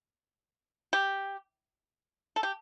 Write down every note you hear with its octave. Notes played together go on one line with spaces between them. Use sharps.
G4
A4
G4